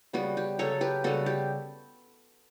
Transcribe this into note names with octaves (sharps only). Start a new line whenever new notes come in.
C#3 G3 B3 F#4
G4
C#3 F#3 C#4 A4 C#5
G4 B4
C#3 G3 B3 F#4 A4
G4